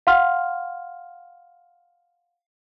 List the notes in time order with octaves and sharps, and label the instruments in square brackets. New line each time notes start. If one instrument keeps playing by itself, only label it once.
[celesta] F5 F#5 C6 F6